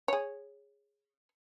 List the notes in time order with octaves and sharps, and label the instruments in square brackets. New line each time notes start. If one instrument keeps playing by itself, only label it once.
[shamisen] G#4 C#5